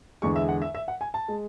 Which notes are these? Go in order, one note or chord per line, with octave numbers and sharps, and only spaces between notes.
E2 D3 G#3 C#6
E5
F#5
E5
E5
F#5
G#5
A5
G#3